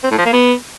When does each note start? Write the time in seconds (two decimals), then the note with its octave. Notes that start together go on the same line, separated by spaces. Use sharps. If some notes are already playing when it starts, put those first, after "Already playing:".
0.04 C4
0.11 A2
0.19 F3
0.26 A#3
0.33 B3